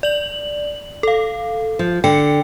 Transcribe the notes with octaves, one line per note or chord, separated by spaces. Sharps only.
D5 F#7
A4 F5
F3
D3 G5 C#7